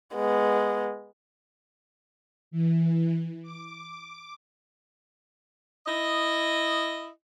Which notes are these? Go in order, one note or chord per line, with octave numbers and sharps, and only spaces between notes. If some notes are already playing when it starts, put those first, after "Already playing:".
G#3 B3
E3
D6
E4 D#5